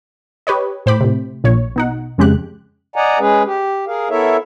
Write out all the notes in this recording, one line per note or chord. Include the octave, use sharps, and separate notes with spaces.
G4 B4 C#5 D#5
A2 C5 G5 B5 D6
A2 C3
A#1 A#2 C#5
B2 D#4 F#5
F2 C#3 G#3 G4 F#6
D5 D#5 F#5 G#5 A#5
G#3 C#4 G#4 B4
G4
G#4 A#4 F5
B3 E4 A4 A#4 C#5 E5